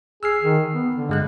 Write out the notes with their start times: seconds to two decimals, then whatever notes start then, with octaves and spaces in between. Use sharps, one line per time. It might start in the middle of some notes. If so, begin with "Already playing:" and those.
0.23 G#4 E6 F6 C7
0.41 D#3
0.74 B3
0.93 D3
1.09 G2 G#3 F#6